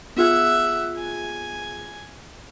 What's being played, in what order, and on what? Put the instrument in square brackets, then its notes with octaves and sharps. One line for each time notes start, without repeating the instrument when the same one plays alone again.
[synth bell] B3 F4 G#4 [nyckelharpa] E5 F#5
[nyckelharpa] G#5